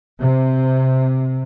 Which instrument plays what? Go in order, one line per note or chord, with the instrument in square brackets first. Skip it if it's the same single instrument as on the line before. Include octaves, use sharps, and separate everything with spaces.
[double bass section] C3